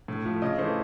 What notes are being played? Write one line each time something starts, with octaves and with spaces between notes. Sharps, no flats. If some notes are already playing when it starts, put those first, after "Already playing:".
A2
F3 A3
C#3 D#5
E3 A3 C5